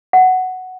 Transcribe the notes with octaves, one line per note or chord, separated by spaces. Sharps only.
F#5